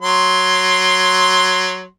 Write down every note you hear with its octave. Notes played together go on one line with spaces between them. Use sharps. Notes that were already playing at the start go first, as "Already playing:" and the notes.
F#3 C6